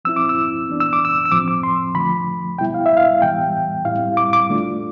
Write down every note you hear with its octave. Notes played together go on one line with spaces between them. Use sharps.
F3 C4 E4 E6
D6
E6
E3 B3 D4
E6
D6
E6
E6
A2 F3 C4 D6
D6
C6
D3 F3 A3 B5
B2 G3 B3 E4 G5
F5
E5
F5
A2 E3 G3 B3 G5
A2 G3 C4 E4 F5
D6
D6
D3 A3 D4 F4